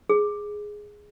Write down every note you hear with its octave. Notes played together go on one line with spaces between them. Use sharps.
G#4